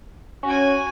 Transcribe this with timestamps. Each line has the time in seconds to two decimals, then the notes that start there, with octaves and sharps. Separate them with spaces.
0.43 C#4 F#4 G#5